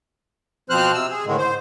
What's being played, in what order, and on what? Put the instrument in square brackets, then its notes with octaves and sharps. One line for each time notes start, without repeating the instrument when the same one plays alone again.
[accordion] B2 F3 C4 C5 F6 F#6
C3 E6
G#4
A2 D3 D#3 G#3
C5